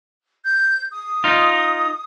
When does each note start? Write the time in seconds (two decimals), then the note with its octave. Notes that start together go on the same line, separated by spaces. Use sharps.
0.44 G6
0.91 D#6
1.24 D#4 F4